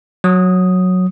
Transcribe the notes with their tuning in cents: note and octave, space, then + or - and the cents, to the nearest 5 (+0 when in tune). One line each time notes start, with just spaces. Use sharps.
F#3 -10 D#6 +0